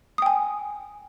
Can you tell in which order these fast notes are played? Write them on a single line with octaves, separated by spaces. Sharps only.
D#6 G5 G#5